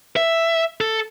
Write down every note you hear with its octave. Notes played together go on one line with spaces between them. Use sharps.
E5
A4